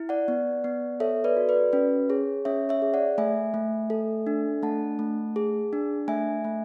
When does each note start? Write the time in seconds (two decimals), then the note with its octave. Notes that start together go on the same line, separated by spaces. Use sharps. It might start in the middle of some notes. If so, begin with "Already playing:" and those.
Already playing: E4
0.09 D5 F#5
0.28 B3
0.64 B3
1.00 A4 C#5 E5
1.24 B4 D5
1.37 F#4
1.49 B4 D5
1.73 C#4 B4
2.09 G#4 C#5
2.45 C#4 C#5 E5
2.69 C#5 E5
2.82 G#4
2.94 D5 F#5
3.18 A3 E5 G#5
3.54 A3
3.90 A4
4.27 D4
4.63 A3 F#5 A5
4.99 A3
5.36 G#4
5.73 D4
6.08 A3 E5 G#5
6.44 A3